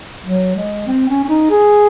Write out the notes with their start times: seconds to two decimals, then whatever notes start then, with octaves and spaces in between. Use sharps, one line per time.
0.24 F#3
0.55 G#3
0.87 C4
1.08 C#4
1.24 C#4
1.29 D#4
1.50 G#4